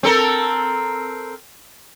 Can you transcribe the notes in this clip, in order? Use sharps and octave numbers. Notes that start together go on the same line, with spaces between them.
C4 A4 A#4